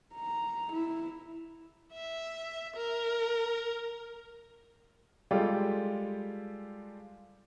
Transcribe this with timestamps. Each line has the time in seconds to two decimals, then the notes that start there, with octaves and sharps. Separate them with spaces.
0.15 A#5
0.73 E4
1.93 E5
2.76 A#4
5.31 G3 G#3 F4 G4 A4